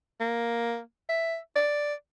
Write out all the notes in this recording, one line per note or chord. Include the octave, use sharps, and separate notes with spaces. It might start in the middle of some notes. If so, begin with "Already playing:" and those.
A#3
E5
D5